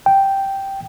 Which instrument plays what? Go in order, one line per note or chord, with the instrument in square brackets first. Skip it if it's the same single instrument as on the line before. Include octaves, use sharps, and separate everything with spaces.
[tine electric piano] G5